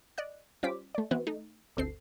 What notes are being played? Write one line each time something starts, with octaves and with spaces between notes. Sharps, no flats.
D5 D#5 F#6
G3 C#4 F4 C5 D6 B6
A3 D5
E3 B3 C4 F#4 B4
A3 D#4
G1 D2 C4 A4 C7